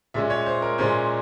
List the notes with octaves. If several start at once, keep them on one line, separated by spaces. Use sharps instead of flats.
A#2 G#3 C#4 E5
C#5
C5
A#4
A#2 G#3 C#4 C5